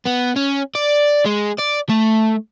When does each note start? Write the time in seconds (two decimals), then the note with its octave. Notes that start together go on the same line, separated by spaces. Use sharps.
0.07 B3
0.36 C#4
0.75 D5
1.26 G#3
1.59 D5
1.90 A3